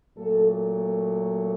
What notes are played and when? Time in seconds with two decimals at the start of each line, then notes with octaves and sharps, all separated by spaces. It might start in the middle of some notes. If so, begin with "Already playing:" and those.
0.17 A#2 F#3 A3 A4
0.46 A4